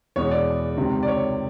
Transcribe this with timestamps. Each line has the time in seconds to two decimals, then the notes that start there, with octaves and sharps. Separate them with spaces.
0.16 E2 B2 G#3 C#5
0.31 D5
0.77 C#2 C3 D#3
1.03 D5
1.08 C#5